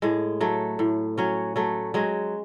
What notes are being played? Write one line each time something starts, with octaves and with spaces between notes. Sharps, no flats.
A2 G#3
F#3 A3
A2
F#3 C#4
F#3 A3
F#3 G#3